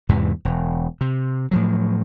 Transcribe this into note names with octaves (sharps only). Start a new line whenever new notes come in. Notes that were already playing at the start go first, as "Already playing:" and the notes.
E2 G#2 C3 E3
E1
C3
A2 F3 F#3